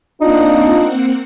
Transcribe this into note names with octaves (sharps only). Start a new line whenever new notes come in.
A#3 C4 D4 D#4 F4 F#5